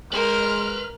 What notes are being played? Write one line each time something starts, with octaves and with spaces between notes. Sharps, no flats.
G#3 A#4 B4 C6 F6